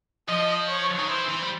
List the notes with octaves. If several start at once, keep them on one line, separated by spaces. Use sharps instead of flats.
F3 D#5
C#5
D#3
E3 C5
E3
G3